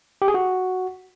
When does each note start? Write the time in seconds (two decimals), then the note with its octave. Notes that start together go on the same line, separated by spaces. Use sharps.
0.22 G4
0.28 G#4
0.34 F#4